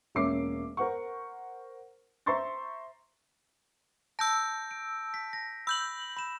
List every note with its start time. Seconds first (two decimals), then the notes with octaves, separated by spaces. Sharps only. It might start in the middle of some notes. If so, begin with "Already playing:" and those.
0.15 E1 A#3 C#4 E5 D6 C7
0.77 A#4 C5 F#5 C#6
2.26 C5 E5 A#5 C6 C#6 A6
4.19 A5 E6 G6 A#6
4.71 D7
5.14 B6
5.33 A#6
5.67 B5 E6 G6 F#7
6.17 B5 E7